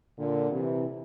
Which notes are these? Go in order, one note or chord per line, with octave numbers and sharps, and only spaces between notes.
A#2 D3
C3 E3